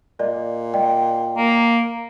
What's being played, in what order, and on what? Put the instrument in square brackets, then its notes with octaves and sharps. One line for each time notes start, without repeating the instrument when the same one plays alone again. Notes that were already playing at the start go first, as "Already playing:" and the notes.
[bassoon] A#2 [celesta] D5 D#5
[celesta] D5 D#5 G5
[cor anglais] A#3